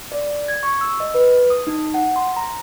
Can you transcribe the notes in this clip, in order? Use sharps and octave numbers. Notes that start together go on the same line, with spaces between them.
D5
G#6
C#6
E6
D#5
B4
D#6
D#4
F#5
C6
A#5